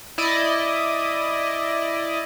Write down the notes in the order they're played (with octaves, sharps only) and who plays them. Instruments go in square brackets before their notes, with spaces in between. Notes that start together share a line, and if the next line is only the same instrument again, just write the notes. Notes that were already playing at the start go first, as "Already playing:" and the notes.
[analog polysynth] E4 D5 D#5